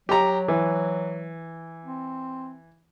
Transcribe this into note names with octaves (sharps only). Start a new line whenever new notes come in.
F#3 G4 A#5
E3
C4